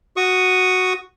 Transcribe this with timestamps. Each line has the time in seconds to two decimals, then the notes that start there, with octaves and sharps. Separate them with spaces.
0.17 F#4 C#6 D#6